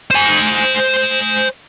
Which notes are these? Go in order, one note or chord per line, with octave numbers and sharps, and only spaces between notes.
C5 G#5